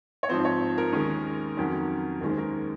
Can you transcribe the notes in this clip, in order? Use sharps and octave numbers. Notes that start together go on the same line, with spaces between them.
C#5
G#2 F3 C4 C5
C#5
A#4
D#2 D#3 G#3 C#4
F2 D#3 F#3 C#4
D#2 D#3 G#3 C#4 A#4
C5
A#4